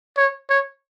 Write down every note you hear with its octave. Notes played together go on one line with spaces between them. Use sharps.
C#5
C#5